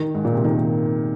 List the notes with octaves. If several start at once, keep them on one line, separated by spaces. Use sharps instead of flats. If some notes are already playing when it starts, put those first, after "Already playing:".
Already playing: D#3
G#2
A#2
C3
D#3